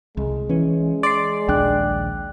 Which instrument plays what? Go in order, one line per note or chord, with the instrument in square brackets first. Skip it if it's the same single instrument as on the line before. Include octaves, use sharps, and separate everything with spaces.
[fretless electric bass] C2 [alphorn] G#3
[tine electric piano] E3 [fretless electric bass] C#4
[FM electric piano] D5 [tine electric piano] C6 C7
[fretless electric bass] A#1 D#2 D4 [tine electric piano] G5 F#6